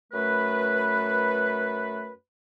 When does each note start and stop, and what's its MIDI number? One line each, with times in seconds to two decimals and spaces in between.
0.13 2.11 42
0.13 2.11 57
0.13 2.11 71